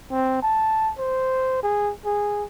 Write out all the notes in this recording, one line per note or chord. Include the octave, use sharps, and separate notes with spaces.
C4
A5
C5
G#4
G#4